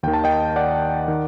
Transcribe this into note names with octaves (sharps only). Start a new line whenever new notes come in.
D#2 D#3 G5
A5
D#5 G5
D5 F#5
D#3